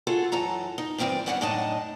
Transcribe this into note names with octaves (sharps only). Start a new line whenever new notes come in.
F4 F#4 G#4 A4
F#2 E3 A4 A#5
D#4
G2 E3 C4 A#4 D5
G3 B3 C#4 D4 D5 F#5
F#2 A2 D4 D#4 D#5 A5